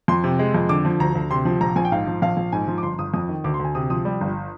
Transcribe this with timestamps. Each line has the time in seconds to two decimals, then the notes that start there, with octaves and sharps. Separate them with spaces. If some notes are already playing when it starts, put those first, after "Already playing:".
0.08 F2 C6
0.24 C3
0.39 G#3
0.54 F2
0.69 D3 D6
0.85 F3
1.00 D2 A#5
1.15 D2
1.30 C3 C6
1.45 F3
1.61 A#1 A#5
1.76 A#1 G#5
1.85 G5
1.92 G#2 F5
2.07 F3
2.22 A#1 F5
2.37 A#1
2.52 G#2 G#5
2.67 F3
2.78 D6
2.83 G1 C6
2.98 G1 D#6
3.14 F2 D#6
3.29 D#3
3.44 D2 D6
3.54 C6
3.59 D2 G#5
3.75 C3 D#6
3.90 F3 D#6
4.05 G3
4.21 G1